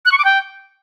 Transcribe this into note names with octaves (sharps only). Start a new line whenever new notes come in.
F#6
C#6
D6
G5